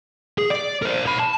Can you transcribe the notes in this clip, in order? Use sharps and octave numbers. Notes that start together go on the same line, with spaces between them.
G#4
D5
A#4 C5
C#5 B5
A5